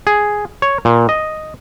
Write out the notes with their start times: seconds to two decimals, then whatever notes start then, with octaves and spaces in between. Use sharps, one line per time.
0.07 G#4
0.62 C#5
0.85 A#2
1.09 D#5